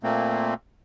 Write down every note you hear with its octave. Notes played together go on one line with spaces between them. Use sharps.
A#2 A3 A#3 C4